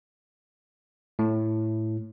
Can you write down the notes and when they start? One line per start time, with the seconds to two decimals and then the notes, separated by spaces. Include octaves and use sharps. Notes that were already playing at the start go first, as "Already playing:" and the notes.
1.19 A2